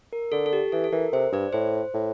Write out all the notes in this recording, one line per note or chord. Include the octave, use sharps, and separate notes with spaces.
A#4
D3 A4
A4
G4
E3 A4
A4
E3 A#4
C3 C5
G2 D5
A2 C5
A2